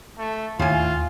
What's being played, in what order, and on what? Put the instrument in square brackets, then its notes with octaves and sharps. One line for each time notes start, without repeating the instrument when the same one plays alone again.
[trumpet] A3
[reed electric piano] D#2 [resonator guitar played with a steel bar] A2 G#5 [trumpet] F4